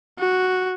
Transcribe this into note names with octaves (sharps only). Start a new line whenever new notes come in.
F#4